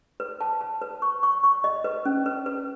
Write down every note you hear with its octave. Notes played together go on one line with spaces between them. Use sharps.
B4
A5
A5
B4
C#6
C#6
C#6
D#5
B4
C#4
B4
B4